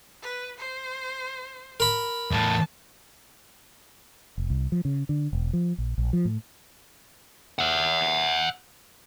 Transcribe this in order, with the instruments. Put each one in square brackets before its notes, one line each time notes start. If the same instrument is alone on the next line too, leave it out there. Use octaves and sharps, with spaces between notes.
[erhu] B4
C5
[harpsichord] A#4 B5
[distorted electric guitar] E2 A2 [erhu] A5
[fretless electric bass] F1
C2
F3
C#3
D3
E1
F3
A#1
A#1
F3
A2
[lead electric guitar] E5 F#5